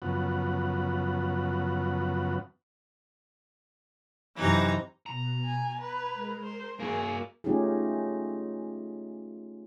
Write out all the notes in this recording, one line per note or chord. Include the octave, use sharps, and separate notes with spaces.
F#2 C#3 F3 B3 F#5
F#2 C3 E3 D#4 A#5
B2 A#5
G#5
B4 G#6
G#3 A#4
A#4 C5
A#3 F#4 G#4
A3 C#4 D#4 F4 G4 G#4